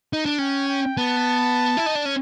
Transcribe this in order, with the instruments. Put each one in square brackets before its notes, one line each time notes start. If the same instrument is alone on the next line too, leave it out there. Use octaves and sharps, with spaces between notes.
[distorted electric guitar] D#4
D4
[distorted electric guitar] C#4 [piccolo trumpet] G5
[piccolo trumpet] G5
[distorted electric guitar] B3 [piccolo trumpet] A5
[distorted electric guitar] E4
D#4
D4
C#4